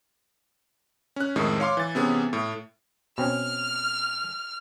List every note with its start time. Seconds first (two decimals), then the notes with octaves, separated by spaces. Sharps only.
1.16 C#4 F#6
1.36 F2 A2 D#3 G#3
1.60 C#5 F5 C6 D6
1.77 E3 A6
1.95 C3 E3 B3 C#4 G#4
2.33 A2
3.18 B2 C4 C#4 F6